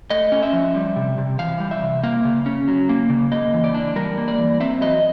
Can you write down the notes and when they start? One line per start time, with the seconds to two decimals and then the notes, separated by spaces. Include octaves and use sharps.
0.10 A3 D#5
0.32 C#4
0.43 E5
0.53 F3
0.75 G3
0.96 C3
1.18 C3
1.39 E3 F5
1.60 G3
1.71 E5
1.82 C3
2.03 A#3 F5
2.25 C#3
2.46 C#4
2.68 F#3
2.89 A#3
3.10 C#3
3.32 A#3 D#5
3.54 E3
3.64 D5
3.74 D4
3.96 G3 A#4
4.17 A#3
4.28 D5
4.38 E3
4.60 C4 E5
4.81 F#3 D#5